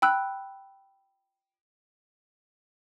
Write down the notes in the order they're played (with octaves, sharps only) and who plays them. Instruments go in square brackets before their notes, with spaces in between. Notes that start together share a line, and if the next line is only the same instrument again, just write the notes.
[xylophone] G5 B5 E6 F#6